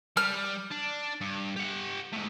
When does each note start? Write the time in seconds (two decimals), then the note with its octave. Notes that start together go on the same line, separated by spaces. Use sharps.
0.17 G3 F6
0.71 D4
1.21 G2
1.56 G4 F#5
2.12 A2 G#3